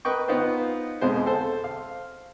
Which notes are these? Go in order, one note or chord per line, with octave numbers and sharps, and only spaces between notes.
A#4 B4 D#5 G5 C#6
B3 D#4 F4 C5
F2 B2 G#3 C5
A4 C5
F5